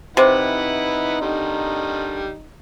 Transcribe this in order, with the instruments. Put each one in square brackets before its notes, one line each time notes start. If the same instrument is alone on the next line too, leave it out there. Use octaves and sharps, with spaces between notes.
[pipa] C3 [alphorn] D#4 [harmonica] E4 B4 F#5
[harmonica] D3 D#3 G3